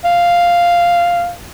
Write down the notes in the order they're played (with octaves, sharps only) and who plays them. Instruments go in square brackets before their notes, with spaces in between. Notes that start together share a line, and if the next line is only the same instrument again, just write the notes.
[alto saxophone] F5